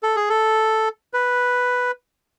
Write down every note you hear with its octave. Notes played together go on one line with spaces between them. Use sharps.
A4
G#4
A4
B4